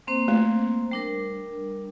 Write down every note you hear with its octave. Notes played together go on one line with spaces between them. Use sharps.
A#3 C4 C5
A3
G3 D4 A#4